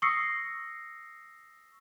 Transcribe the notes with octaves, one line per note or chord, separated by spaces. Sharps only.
C#6 D#6 E6 A#6 C7 C#7